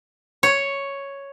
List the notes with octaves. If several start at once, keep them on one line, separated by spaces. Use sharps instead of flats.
C#5